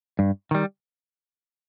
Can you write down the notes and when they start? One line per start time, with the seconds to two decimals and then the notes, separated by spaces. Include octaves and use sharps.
0.19 G2
0.51 D#3 G3